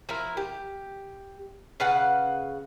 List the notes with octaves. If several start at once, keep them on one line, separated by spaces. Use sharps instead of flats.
F3 E4 A#4
G4
C#3 B4 F5 F#5